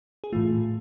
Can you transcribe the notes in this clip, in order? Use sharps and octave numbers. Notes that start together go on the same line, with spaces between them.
G#4
A2 E3 A3 F4